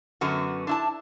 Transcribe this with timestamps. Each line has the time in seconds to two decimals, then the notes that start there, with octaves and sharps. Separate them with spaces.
0.21 F#2 D3 B3 F#4
0.67 D4 E4 A5